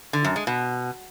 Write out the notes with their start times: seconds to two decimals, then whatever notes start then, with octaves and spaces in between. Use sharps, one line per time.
0.13 D3
0.25 F#2
0.36 G#3
0.47 B2